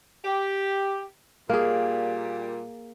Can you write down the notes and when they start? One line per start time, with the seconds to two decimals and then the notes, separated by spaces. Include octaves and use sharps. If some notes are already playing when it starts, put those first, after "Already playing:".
0.25 G4
1.50 A#2 G3 A#3 G#4